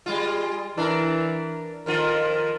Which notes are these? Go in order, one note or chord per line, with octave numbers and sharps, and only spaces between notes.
G3 G#3 F4
E3 D4 A#4
F2 D#3 F4 A#4